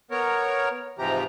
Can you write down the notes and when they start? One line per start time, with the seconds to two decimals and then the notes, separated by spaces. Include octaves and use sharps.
0.11 B3 A#4 C#5
0.99 G#2 C3 E3 F3 G4 A#5